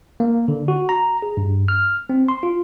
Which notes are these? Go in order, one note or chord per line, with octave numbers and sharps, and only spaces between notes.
A#3
D3
F#4
A#5
G#4
G2
F6
C4
C6
F4